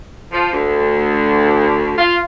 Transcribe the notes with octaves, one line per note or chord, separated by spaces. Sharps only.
F3
D2
F4